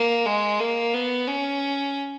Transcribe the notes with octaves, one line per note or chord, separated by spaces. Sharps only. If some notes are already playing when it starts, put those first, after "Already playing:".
Already playing: A#3
G#3
A#3
B3
C#4